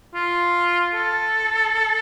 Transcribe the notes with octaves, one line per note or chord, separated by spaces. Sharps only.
F4
A4